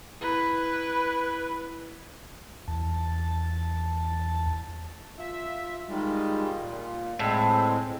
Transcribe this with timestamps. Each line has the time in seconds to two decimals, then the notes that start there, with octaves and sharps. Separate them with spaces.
0.21 E4 B4
2.68 E2 A5
5.19 F4 E5
5.89 D#3 G3 G#3 F4
6.60 A#2
7.19 A2 G#3 C4